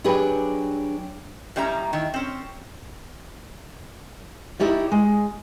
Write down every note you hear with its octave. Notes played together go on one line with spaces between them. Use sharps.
F#3 D4 G4 G#4 B4
A2 G3 C#4 E5 A#5
D#3 E4
C4 C#4
D#4 E4 G4 C#5 D5
G#3